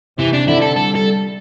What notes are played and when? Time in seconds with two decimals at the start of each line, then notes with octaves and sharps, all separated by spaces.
0.18 C3 E3
0.33 D4
0.47 D3 E4
0.62 A4
0.76 G3 A4
0.96 A4